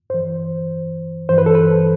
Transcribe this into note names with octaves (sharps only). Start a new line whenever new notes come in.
G2 E3 C5
G2 E3 C5
B4
A4
B4